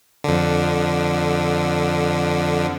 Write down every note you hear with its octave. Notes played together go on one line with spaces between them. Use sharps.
F2 D3